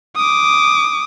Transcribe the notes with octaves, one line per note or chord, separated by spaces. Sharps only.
D6 D#6